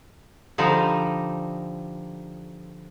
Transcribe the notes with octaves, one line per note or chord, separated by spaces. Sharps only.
D3 F3 G3 D#4